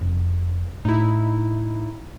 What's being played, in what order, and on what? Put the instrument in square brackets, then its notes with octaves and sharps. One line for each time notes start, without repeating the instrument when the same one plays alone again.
[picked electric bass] F1
[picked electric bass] A2 [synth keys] D#4 E4